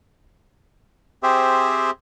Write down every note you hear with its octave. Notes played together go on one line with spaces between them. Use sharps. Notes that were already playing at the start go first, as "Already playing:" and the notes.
C4 G4 G#4 C5 E5